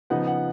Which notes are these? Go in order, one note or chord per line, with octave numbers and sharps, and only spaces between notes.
C#3 F3 B3 D#4 F#5
F#5